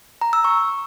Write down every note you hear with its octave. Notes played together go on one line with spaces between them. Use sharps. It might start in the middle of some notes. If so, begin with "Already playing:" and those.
A#5
E6
C#6